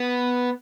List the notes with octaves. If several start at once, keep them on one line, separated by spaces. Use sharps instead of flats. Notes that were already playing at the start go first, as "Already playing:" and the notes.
Already playing: B3